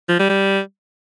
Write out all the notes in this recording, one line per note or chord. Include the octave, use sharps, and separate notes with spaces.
F3
G3
G3